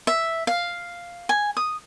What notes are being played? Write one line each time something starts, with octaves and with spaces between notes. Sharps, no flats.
E5
F5
G#5
D#6